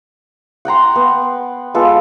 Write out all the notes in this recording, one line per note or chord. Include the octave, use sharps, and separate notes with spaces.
F#5 G5 A#5 C6
B3
G#3 B3 F4 A4